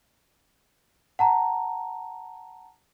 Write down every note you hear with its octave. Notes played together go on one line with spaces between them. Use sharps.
F#5 A5 A#5